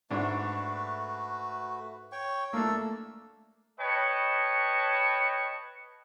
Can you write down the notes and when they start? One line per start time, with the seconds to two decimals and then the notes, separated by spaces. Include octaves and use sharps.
0.11 G#2 A3 D4 F#4 B4
2.12 C#5 G5 C#6
2.53 A3 A#3 D4 A4 E6
3.80 B4 C#5 D#5 G5 A5 C#6